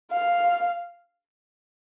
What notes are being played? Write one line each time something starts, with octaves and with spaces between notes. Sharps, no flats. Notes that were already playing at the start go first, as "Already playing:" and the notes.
F5